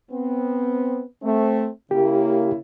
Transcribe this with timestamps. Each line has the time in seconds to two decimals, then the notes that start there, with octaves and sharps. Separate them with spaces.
0.11 B3 C4
1.22 A3 C4
1.91 C#3 A#3 E4 G4